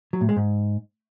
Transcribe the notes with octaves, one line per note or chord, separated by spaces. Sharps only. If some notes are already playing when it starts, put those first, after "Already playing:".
F#3
A2
G#3
G#2